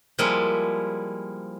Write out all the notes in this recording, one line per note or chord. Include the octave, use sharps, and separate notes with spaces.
F3 G3 G#3 A#3 E4